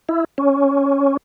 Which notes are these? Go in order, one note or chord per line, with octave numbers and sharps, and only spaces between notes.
E4
C#4